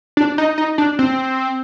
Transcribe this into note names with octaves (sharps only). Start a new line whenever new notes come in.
D4
D#4
D#4
D4
C4